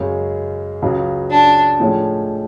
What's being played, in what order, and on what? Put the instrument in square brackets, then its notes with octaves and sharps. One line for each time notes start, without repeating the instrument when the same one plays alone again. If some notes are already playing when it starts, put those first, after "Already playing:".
Already playing: [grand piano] F#2 C#3 G#3 C#4
C#2 C#3 F#3
[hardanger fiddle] D4
[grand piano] A2 F3 G#3 C#4